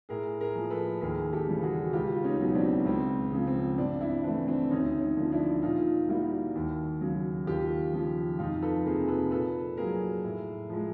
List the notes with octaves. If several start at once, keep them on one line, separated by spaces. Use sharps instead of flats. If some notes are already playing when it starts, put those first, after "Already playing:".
A2 G#4 A#4
G#4 A#4
F3 A#3
A4 B4
D#2 G#4 A#4
G4 A4
C#3 E3 G3
F#4 G#4
C#2 F4 G4
C#4 D#4
B2 F#3
C4 D4
C#2 C4
C#3 F3
C4
G2 C4 D4
D4 E4
E3 A3 C4 D4
C4 D4
D2 C#4 D#4
C#4 D#4
D3 F3 A#3
D4 E4
A#2 D#4 F4
G3 A#3 E4 F#4
D#2
C#3 F#3
D#2 F4 G4
C#3 F3
F2 D#4 F4
A4 B4
C3 F3 A#3 G#4 A#4
A4 B4
A#2 A4 B4
F#3 A#3 G#4 A#4
A2
F3 G#3